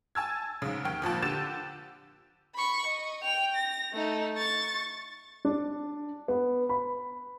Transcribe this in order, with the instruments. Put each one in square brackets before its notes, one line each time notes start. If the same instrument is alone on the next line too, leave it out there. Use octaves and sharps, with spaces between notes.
[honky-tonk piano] G#5 A5 E6 G#6
G#2 C#3
D#2 G5 F6
G#1 F2 A#2 A5
D3 G4 A6 E7
[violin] B5 C#6
D#5
G5 F7
A#6
A3 D#4
C#6 A6
[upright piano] D4
B3
B5